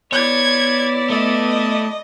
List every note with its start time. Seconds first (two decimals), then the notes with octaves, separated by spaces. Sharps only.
0.12 B3 E4 C#5 D5 G#6
1.10 A3 D#5